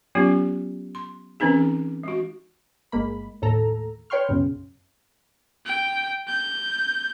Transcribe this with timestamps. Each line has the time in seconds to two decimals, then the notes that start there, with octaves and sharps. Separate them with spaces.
0.15 F#3 B3 C#4 F4 G4
0.95 C6
1.40 E3 C4 C#4 D#4 G#4
2.03 G#3 F#4
2.92 G1 G#3 A#3 B5
3.42 D#2 A2 A4 A#5
4.10 B4 C#5 G5 C6 C#6 F6
4.29 B1 F#2 C#3
5.66 G5
6.28 G6